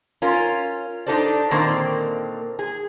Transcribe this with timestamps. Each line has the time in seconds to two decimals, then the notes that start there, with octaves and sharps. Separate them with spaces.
0.22 C#4 F4 A#4
1.07 D4 D#4 G4 A4 C5 D5
1.51 A#2 D3 D#3 A#3 C4
2.59 G#4